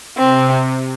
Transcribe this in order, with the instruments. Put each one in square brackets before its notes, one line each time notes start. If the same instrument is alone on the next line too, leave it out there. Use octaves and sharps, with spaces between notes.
[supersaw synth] C3 [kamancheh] C4